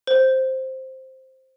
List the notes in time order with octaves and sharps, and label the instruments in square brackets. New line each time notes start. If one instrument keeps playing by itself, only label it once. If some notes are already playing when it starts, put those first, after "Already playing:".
[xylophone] C5